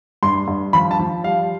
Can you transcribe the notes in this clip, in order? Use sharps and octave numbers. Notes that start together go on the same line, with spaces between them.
G2 C6
G2
F3 B5
A5
F3
G3 F5